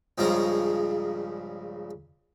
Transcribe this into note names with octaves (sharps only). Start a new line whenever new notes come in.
A#1 G2 C#3 F3 G#3 A#5